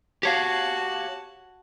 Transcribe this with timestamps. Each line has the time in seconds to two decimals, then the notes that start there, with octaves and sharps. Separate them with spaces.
0.23 F#4 G4 C#5 F5 A5